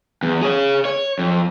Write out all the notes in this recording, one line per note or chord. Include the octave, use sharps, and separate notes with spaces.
E2
G#4 C#5
C#5
F2